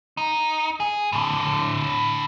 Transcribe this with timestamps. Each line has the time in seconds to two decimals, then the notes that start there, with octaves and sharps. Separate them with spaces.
0.17 D#4
0.80 G#4
1.12 A2 D3